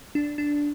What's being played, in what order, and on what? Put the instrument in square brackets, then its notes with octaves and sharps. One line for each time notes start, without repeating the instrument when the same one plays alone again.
[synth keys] D4
D4